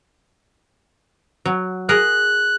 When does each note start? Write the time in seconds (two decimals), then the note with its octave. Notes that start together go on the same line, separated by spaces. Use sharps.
1.46 F#3
1.89 G#4 A#4 F#6